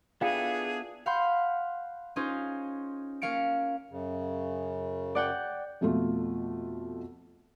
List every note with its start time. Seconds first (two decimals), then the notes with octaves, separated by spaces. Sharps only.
0.21 B3 D4 E4 F4 G#4 A4 F5 G5
1.06 F5 F#5 B5 C6 F6 G6
2.16 C#4 D#4 F4 G#4 C5
3.22 A#3 C#4 F5 C#7 D7
3.90 F#2 C#3
5.15 D5 F#5 G5
5.81 F2 B2 A3 F4